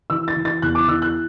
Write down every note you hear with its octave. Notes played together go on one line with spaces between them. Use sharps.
E3 E6
A6
E3
A6
E2 F#6
D6
E3 E6
F#6